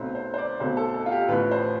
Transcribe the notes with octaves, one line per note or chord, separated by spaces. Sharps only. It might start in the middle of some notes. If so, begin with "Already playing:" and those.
Already playing: B1 B2 A3 C4 C5
C5
C5
D5
B1 B2 A3 C4 C5
A4
A4
F4
G4
A1 A2 F3 B4
C5